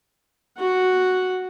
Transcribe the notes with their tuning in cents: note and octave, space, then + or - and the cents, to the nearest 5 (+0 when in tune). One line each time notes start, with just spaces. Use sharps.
F#4 +0 F#5 +0